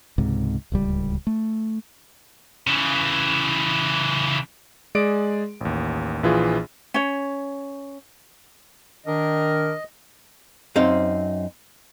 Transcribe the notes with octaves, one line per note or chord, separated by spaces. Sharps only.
C#2 G#2 C3
D1 C#2 G3
A3
C#3 E3
G#3 G#4 D5 D7
A1 D#2
A#1 E3 F4 G#4
C#4 C#5
D#3 D4 A#4 D#5
F#2 C4 D#4 C5 F5